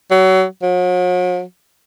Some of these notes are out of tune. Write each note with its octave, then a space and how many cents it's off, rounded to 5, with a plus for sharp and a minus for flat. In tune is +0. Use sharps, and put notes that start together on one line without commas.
F#3 +25
F#3 -40